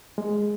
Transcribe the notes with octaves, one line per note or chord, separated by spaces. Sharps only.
G#3